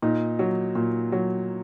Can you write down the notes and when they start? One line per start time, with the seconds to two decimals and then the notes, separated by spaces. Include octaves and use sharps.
0.02 A#2 D#4
0.39 F#3
0.75 A#2
1.12 F#3